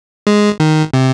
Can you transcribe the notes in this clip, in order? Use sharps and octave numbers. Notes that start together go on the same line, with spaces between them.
G#3
D#3
C3